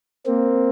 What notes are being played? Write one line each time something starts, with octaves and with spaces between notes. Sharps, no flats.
A#3 C4